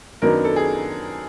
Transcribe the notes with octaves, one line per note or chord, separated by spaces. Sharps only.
F#2 D#3 F#3 B3 D4 A#4
A4
G#4